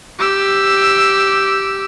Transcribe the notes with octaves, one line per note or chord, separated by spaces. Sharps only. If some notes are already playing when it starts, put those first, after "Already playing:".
G4 E6